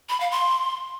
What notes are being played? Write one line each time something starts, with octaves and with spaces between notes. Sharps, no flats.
B5
F5
C6